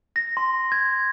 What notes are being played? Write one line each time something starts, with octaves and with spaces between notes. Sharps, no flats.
A#6
C6
G#6